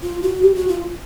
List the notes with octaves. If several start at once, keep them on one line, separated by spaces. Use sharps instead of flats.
F4
F#4
G4
F#4
F4